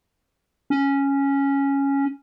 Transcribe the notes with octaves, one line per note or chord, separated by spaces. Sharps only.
C#4